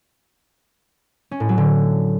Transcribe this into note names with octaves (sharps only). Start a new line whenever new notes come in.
C#4
A2
F#3
D3